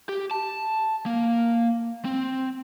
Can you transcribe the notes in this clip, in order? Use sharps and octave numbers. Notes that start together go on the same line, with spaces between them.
G4
A5
A#3
C4